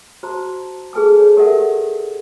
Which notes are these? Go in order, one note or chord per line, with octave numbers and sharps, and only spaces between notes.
F#4 C5 A5 A#5
G#4 A4 B4 G#5 A5 D#6
C#5
G4 A4 A#4 D5 E5 F#5